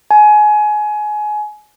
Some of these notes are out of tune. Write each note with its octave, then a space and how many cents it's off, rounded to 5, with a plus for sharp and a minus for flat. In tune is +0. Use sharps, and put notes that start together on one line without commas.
G#5 +25